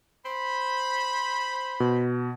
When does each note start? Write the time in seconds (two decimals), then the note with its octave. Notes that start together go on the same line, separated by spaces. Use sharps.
0.26 C5 B5
1.80 B2